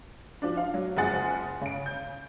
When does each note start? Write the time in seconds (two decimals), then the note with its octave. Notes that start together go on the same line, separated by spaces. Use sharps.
0.42 F3 D4
0.57 F5
0.74 F#3
0.97 F#1 F3 G#3 G#4 F#5 A6
1.61 C#3 D7
1.86 G6